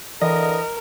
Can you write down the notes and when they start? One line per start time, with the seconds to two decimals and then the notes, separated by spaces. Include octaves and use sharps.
0.21 D3 E3 A#4 D#5